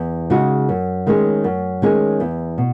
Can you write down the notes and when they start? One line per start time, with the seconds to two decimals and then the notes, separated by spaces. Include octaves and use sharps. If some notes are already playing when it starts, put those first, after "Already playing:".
Already playing: E2
0.30 C#3 G#3 D#4 F#4
0.69 F#2
1.07 D#3 G#3 C#4 G#4
1.44 F#2
1.82 D#3 G#3 C#4 G#4
2.20 E2
2.58 B2